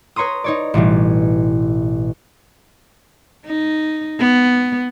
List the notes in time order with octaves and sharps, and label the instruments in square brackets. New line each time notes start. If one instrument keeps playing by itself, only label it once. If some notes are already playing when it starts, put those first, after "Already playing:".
[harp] B4 C#5 A#5 C6 D#6
D#4 C#5 D5
A1 B2 E3 G3
[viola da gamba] D#4
B3